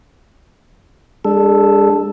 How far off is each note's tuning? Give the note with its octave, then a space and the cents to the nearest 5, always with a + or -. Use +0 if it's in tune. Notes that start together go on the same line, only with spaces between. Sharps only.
G#3 -40 D4 +0 A4 +0